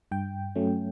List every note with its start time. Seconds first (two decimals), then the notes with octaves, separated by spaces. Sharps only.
0.11 G2 G5
0.56 F#3 A3 C#4